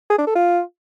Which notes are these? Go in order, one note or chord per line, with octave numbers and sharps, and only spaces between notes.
G#4
D4
A4
F4